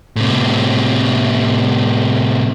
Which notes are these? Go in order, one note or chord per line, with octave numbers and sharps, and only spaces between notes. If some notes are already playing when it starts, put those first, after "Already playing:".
A2 C3